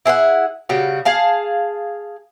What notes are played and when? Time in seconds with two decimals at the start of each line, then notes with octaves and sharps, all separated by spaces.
0.06 E4 G#4 C5 F#5
0.69 C#3 G3 F#4
1.05 G#4 F5 A5